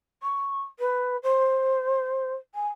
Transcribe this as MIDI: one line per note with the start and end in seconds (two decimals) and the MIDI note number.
0.22 0.60 85
0.78 1.16 71
1.22 2.33 72
2.54 2.68 80